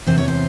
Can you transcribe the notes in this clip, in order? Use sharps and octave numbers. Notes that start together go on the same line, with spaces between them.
E2 C3 E3 C5
C#5
C5